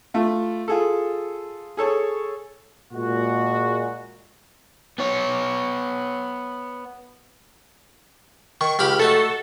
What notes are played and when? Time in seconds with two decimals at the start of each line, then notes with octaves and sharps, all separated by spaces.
0.14 A3 F4
0.68 F4 G#4 A4
1.77 G#4 A4 C#5 A5
2.93 A#2 G#3 F#4
4.99 B3 C#5
8.61 D#3 C#6
8.79 C#2 G4 B5 F6
8.99 A3 D#4 F#4 A4